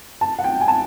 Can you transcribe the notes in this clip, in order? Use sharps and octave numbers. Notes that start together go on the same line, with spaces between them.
A5
F#5
G5
G#5
A5